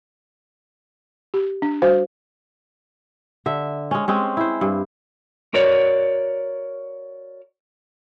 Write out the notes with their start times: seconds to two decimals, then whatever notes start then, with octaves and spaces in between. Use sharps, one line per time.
1.34 G4
1.62 D4
1.82 G3 F#4 C5 F5
3.46 D3 E5
3.91 G#3 C#4
4.08 G#3 C4 C#4
4.37 E4 C5
4.61 G2
5.54 F#4 A#4 C#5 D5